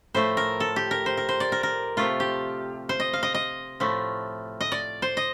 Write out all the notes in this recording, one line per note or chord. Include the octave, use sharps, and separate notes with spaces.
A2 F3 A3 C5
A#4
A4
G4
A#4
C5
A#4
C5
D5
A#4
A#4
C3 F3 A3 F4
G4
C5
D#5
F5
D#5
D#5
A2 F3 A3
D#5
D5
C5
D#5